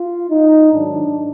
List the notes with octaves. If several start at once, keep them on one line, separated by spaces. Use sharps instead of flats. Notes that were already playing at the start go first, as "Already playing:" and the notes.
Already playing: F4
D#4
G#2 D#3 F#3 D4